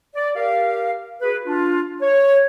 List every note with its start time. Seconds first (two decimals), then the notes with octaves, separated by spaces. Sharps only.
0.15 D5
0.36 G4 A#4 F5
1.22 F#4 G#4 B4
1.46 D4 F4
2.02 C#5